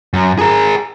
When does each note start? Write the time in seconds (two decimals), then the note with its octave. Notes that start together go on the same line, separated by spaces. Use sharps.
0.13 F#2
0.38 G#4 A#4